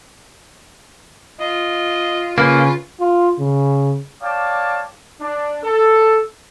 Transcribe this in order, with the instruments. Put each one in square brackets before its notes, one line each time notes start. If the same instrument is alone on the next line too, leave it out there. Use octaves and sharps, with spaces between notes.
[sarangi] F4 [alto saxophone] D#5
[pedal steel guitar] C#3 C#4 [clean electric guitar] A#3 [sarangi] F4 [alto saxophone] B4
[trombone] F4
C#3
[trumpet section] C#5 D5 F5 G5 A5 D6
D4
A4